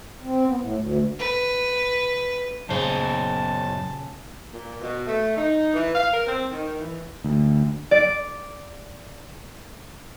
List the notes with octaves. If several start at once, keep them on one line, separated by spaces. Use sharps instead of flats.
C4
B3
A2
D2
B4
F#2 A#2 C#3 C5 F5 A5
A#2
B2
A3
D#4
E3
F5
A#4
C4
D#3
E3
D2
D5 D7